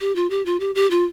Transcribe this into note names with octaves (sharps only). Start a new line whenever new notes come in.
G4
F4
G4
F4
G4
G4
F4